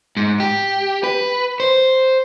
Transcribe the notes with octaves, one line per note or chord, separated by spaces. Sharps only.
G#2
G4
B4
C5